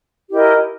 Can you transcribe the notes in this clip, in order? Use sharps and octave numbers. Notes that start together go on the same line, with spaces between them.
E4 G4 A#4 D#5